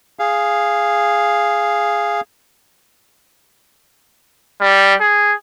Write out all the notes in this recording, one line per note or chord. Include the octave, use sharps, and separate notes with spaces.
G#4 F5
G3
G#4